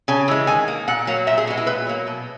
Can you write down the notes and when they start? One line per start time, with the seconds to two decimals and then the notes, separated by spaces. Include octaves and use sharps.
0.08 C#3 G#5
0.28 E3 G#3
0.47 D#3 G#5
0.68 A#3
0.88 A#2 F#5
1.07 F#3 A#3
1.27 A#2 E5
1.38 G#4
1.47 G#3 B3 F#4
1.57 E4
1.67 A#2 B4
1.87 F#3 A#3
2.07 B2